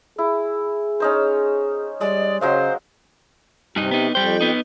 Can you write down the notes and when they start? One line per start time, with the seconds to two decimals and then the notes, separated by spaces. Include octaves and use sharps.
0.18 E4 G#4
1.00 C#4 D#4 C5
2.01 G3 G#3 D5
2.41 C#3 F#3 G#3 C5 F5
3.76 G2 C3 D#4
3.91 B3 D#4
4.15 F2 G3 C5 G5
4.41 B3 D#4